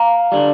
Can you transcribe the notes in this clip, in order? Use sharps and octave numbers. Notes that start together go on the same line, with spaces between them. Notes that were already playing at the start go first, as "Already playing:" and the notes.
Already playing: F5 A#5
D3 G3